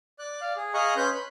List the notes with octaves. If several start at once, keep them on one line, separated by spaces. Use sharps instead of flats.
D5 F#6
D5 F5
G#4
G#4 D#5 F5 A#5 C#6 F#6
C#4 B4 C6 F#6 G6
B5